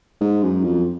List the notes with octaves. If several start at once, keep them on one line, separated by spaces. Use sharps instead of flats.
G#2
F#2
F2